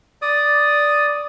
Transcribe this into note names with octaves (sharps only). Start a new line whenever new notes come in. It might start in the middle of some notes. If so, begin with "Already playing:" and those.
D5 D#6